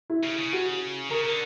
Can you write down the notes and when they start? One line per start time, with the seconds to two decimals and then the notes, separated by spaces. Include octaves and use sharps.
0.10 E4
0.23 C#3
0.38 C#3
0.53 F#4
1.11 C#3 A#4
1.25 D3